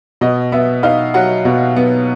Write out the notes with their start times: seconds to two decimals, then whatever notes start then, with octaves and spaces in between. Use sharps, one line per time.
0.21 B2 D#5
0.52 B3 E5
0.83 D#4 F5
1.14 F#3 F#5
1.45 B2
1.76 B3